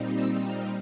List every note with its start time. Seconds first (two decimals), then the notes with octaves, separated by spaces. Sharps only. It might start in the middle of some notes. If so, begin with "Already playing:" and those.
Already playing: A#2 G3 C4 D#4
0.15 E6
0.45 F6